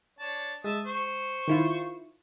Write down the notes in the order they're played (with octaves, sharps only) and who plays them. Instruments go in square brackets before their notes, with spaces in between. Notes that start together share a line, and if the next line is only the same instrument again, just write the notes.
[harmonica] D4 C#5 A5
[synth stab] G#3 [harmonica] E5 A5 D#6
[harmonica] C5 C#6
[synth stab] D#3 E4 F4